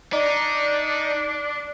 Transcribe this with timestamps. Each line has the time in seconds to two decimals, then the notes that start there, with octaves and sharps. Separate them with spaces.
0.13 D4 D#4 D5